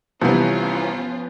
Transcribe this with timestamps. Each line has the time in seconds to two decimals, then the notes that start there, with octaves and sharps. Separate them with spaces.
0.21 C2 E3 F3 B3 C#4 F4